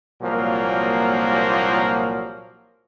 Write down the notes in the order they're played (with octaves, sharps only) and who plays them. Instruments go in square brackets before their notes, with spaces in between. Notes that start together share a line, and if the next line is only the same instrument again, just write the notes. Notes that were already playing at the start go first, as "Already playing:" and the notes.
[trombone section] C2 A#2 F3 F#3 A#3